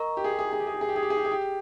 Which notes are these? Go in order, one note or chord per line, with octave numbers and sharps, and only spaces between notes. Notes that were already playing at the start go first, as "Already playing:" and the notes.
Already playing: A#4 D#5 A#5 C#6
G4
G#4
G4
G#4
G4
G#4
G4
G#4
G4
G#4
G4
G#4
G4
G#4
G4
G#4
G4